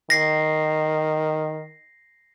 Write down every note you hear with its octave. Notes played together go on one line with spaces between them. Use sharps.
D#3 A#6 C7